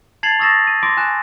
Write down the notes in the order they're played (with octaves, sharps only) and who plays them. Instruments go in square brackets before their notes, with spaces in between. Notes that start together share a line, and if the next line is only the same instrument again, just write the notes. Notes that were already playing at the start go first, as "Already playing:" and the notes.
[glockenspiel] A5 G#6 A6 C7 F7 F#7
C#6 D#6 E6 A6 A#6 E7
D#7
C6 D6 A#6 D7
G#5 F#6 E7